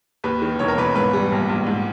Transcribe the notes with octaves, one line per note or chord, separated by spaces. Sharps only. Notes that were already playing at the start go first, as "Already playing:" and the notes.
D#2 B4
D#3
E1 C#5
A#4
E1 B4
G#2 B4
G3
A#1
A#1
G#2